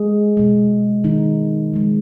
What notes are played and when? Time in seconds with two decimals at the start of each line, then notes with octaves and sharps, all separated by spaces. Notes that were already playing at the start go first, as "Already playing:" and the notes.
Already playing: G#3 G#4
0.37 B2 G#3
1.04 D#3 D#4
1.72 C#3 F3 G#3